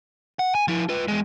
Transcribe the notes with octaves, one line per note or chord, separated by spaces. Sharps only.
F#5
G#5
F3 E4
F4 B4
E2 G#3